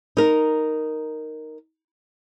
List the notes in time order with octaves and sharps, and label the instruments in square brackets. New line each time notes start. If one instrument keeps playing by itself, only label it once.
[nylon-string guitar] D#4 A#4